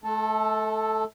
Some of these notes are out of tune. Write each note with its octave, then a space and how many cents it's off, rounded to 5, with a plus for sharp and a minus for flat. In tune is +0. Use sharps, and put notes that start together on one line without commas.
A3 -35 A4 +0